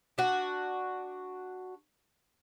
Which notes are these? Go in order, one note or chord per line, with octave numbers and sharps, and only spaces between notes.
D4 F#4